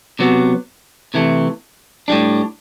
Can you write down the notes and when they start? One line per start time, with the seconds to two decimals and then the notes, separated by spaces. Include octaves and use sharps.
0.19 C3 F#3 B3
1.14 C3 E3 A3
2.08 A2 G3 D4